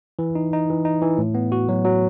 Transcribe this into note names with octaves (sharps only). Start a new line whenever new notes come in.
E3
D#4
D#4
E3
D#4
E3
A2
B3
F#4
F#3
F#3